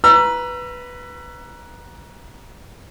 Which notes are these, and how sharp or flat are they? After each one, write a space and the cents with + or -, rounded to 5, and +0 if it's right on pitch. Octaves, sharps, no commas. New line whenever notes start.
B4 +0 A#5 +20 E6 +35